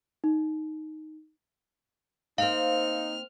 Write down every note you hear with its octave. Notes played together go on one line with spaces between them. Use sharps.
D#4
A#3 C4 D#4 F5 F6